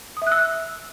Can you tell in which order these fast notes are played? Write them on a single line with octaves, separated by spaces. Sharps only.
D#6 E5 F#6 E6